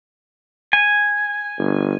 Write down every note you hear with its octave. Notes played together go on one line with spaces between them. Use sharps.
G#5
G1